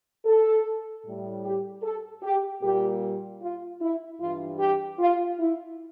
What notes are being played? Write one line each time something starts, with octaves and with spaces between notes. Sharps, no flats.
A4
A2 G3
G4
A4
G4
A#2 G3 G4
F4
E4
G2 E3 G3 F4
G4
F4
E4